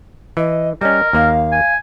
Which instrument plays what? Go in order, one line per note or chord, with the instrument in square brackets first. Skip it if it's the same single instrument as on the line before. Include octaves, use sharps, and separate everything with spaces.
[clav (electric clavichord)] E3 [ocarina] D#5
[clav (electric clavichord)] G3 C#4 [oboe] A#4 [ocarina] D#5
[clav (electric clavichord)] D#2 A#3 [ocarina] F5
[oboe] G#5